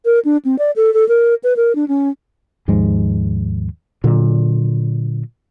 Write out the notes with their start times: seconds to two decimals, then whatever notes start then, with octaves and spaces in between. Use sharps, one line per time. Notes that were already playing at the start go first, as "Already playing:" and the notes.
0.05 A#4
0.25 D4
0.45 C4
0.59 D5
0.76 A4
0.94 A4
1.09 A#4
1.44 B4
1.57 A#4
1.75 D4
1.88 C#4
2.68 D#2 G#2 F3 G#3
4.04 A#2 D3 F#3